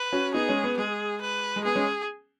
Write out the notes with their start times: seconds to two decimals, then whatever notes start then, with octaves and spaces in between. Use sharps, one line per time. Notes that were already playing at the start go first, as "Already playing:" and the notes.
Already playing: B4
0.13 C#4 F#4
0.34 B3 D#4 G#4
0.49 G#3 C#4
0.64 B3
0.77 G#3 G#4
1.22 B4
1.56 G#3
1.65 B3 G#4
1.75 G#3 C#4